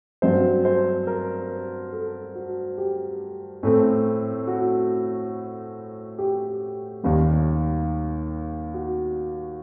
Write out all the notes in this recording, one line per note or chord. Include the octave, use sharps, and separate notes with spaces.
G2 F#3 C4 C5
C5
A#4
A4
F#4
G4
A2 A3 C4
F#4
G4
D#2 D#3 G3 A#3
F#4